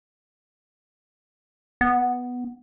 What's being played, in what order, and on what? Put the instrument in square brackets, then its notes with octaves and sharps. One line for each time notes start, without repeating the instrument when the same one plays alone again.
[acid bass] B3